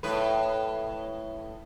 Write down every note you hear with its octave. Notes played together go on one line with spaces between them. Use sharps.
A2 B4